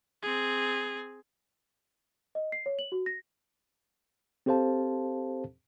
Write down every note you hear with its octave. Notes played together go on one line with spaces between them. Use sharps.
C4 G#4
D#5
C7
C#5
F#7
F#4
A#6
C4 G4 A4 C5 F5 A5